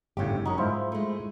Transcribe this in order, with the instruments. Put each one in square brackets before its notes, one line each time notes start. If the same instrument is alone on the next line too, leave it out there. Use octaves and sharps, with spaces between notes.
[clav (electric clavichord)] G1 A2 [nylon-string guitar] C#3 G4
[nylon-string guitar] F#2 C#4 [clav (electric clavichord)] D#4 F#4
[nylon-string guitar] G#2 [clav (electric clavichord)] E4 F4 C5
[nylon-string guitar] G#3 A3